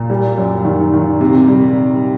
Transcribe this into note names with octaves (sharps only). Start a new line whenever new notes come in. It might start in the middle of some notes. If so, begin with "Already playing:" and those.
Already playing: A#2
G3
F#2
D#3
D#3
C3
G3